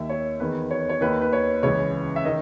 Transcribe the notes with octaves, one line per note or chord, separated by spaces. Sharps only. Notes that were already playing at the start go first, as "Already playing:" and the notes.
Already playing: D#2 D#3 E5
C#5
E2 D#3 B4
C#5
C#5
D#2 D#3 B4
B4
C#5
C#2 C#3 E3 C#5
E5
D#3 D#5